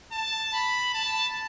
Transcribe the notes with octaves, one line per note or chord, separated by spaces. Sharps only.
A5
B5
A5